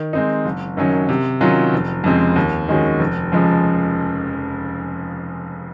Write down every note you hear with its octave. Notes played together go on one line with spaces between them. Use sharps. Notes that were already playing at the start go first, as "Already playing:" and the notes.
Already playing: D#3
G#3 C4 D#4
F#1
F#2 D#3 F#3 C#4
C3
D#3 F#3 C#4 F4
F1
F2 C#3 G#3 C4
D#2
D#3 G#3 C#4 F#4
F1
F2 C#3 F3 G#3